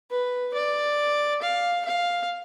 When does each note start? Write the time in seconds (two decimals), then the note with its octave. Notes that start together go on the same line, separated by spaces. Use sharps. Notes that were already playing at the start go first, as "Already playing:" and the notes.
0.11 B4
0.55 D5
1.42 F5
1.86 F5